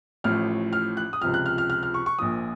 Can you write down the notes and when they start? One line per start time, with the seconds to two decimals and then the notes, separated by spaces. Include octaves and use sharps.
0.24 A1 A2 F3 F6
0.73 F6
0.97 F#6
1.13 D#6
1.21 C#2 C3 F3 F6
1.34 F#6
1.46 F6
1.58 F6
1.70 F6
1.83 F6
1.94 C#6
2.06 C#6
2.18 A#1 A#2 F3 D#6